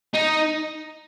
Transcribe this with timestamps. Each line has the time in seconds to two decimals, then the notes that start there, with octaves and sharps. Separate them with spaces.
0.14 D#4